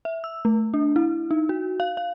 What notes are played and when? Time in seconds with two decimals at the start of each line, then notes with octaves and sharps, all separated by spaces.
0.05 E5
0.24 E6
0.45 A3
0.74 D4
0.96 E4
1.31 D#4
1.49 F#4
1.80 F5
1.97 F5